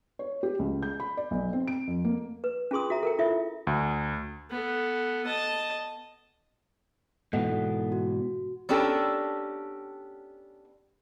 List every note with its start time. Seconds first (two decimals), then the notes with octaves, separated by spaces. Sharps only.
0.19 C#5
0.43 G4
0.59 C#2
0.83 G6
1.00 B5
1.17 D5
1.31 B1
1.53 C4
1.67 D7
1.87 F2
2.05 A#3
2.44 B4
2.71 C#4 F4 G#4 C6 D#6
2.90 F#4 E5 A#5
3.03 A4 A#4 G5
3.19 E4 F4 A4 E5
3.67 D2
4.51 B3 A4
5.26 D#5 A5
7.33 G#2 B2 E3 A4 D#5 F#5
7.92 F#4
8.69 B3 C#4 D4 G4 A4 A#4